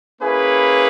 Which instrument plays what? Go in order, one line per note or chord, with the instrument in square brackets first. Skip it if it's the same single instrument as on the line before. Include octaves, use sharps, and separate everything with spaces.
[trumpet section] A#3 C#4 E4 G#4 B4